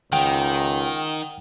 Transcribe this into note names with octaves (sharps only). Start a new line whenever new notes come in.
C#2 D#3 F#5 G5